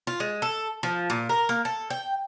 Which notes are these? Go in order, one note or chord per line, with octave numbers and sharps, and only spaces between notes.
F4
G#3
A4
F3
A#2
A#4
A#3
A4
G5